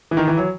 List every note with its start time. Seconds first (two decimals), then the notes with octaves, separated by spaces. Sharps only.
0.11 E3
0.17 D#3
0.28 E3
0.37 F#3